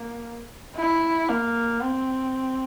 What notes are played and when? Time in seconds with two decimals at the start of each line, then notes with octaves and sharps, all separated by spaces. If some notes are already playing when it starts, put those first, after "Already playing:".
Already playing: A#3
0.76 E4
1.29 A#3
1.81 C4